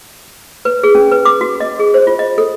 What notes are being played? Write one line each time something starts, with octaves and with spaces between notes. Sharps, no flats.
B4
G#4
C#4
B4
D6
F#4
D#5
G#4
C5
F4
D#5
A4